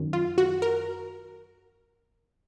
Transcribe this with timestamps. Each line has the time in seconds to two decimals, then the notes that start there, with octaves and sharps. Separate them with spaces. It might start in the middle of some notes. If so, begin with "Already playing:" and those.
Already playing: F#2 D#3
0.13 F4
0.38 F#4
0.62 A#4